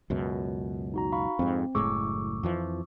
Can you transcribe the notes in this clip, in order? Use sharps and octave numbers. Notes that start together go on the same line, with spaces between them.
C#2 F#2 B2
D#4 F#4 A#5
F5 B5 C#6
F2 G#2 C4
F#1 A2 G#3 C#6 D6 E6
F2 E3 F3